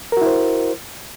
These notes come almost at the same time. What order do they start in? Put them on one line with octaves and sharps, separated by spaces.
A#4 F#4 E4 C5